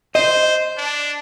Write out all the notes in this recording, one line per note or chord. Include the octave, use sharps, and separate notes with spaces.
C5 D#5
D4